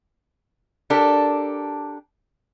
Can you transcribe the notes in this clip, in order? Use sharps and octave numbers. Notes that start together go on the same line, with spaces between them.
D4 G4 A4 A#4